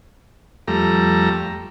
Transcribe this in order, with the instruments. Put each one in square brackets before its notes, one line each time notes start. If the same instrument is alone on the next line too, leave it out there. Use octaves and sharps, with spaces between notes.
[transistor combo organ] F2 G3 A3 A#5